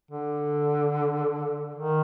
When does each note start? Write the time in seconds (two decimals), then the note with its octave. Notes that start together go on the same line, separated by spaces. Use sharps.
0.11 D3
1.74 D#3